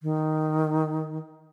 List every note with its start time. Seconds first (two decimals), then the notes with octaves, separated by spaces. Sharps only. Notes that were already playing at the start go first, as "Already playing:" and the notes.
0.03 D#3